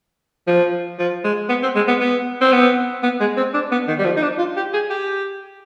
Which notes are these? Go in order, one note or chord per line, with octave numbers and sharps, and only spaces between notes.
F3
F3
G#3
B3
C4
G#3
B3
B3
C4
B3
B3
G#3
C4
D4
B3
D#3
G3
F3
D#4
D4
F4
G4
G#4
G4